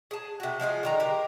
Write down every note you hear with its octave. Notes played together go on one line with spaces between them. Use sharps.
G#4 A5
C3 F#4
F3 G#3 F4 G#4
D3 D#3 A#5
G4 A#4